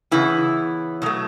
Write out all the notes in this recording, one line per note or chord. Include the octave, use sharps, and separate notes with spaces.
C#3 E3 B3 E4
B2 F#3 A3